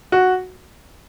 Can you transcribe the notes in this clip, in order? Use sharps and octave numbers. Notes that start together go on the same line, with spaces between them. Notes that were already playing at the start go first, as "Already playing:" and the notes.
F#4